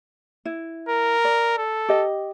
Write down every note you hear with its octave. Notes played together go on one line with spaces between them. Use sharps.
E4
A#4
D5
A4
G4 D#5